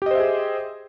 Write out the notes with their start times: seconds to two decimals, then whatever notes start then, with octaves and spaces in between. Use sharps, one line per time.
0.02 G4
0.06 D#5
0.11 C5
0.15 E5
0.20 G#4